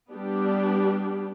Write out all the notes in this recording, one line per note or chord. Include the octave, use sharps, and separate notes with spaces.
G3 B3 D4 G4